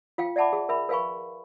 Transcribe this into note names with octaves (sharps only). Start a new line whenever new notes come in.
F4 F5 G5
D5 E5 F#5 A5 B5 D6
G#4
A#4 E5 B5
A#4 B4 F5 G#5 B5 C#6